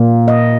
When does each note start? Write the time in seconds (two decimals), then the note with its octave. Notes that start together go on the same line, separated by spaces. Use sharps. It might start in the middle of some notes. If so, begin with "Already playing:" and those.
Already playing: A#2 A#3
0.28 D#5